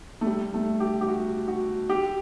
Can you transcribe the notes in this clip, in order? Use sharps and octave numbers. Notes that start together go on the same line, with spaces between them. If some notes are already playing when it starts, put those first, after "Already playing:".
A3
G3
A3
G4
G4
F#4
F#4
G4